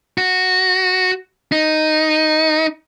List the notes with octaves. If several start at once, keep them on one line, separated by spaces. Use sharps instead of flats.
F#4
D#4